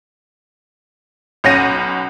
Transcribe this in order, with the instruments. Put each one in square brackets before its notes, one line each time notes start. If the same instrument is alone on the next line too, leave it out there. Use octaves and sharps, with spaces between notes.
[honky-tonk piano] B1 C#4 F#5 A#6 D#7